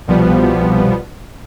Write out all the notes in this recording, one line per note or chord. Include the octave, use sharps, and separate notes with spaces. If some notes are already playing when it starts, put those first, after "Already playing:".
C2 B2 F3 G3 B3